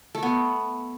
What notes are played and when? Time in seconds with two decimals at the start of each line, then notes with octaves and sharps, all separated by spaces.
0.15 A3
0.23 B3